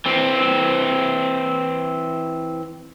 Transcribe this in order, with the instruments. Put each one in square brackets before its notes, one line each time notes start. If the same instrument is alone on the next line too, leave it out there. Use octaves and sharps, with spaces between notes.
[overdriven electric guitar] E3 C4